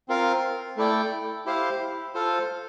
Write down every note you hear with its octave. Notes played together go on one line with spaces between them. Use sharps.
C4 F4 A#4 F5
A3 E4 A4 D5 G5
E4 G4 C5 F5
F4 A4 C5 F5